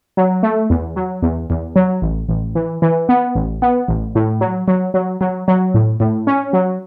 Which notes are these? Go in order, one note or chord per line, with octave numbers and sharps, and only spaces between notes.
F#3
A3
E2
F#3
E2
E2
F#3
A1
A1
E3
E3
B3
A1
B3
A1
A2
F#3
F#3
F#3
F#3
F#3
A2
A2
C#4
F#3